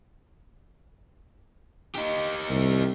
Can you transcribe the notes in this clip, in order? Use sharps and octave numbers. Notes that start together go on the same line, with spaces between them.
D#4 G4
C2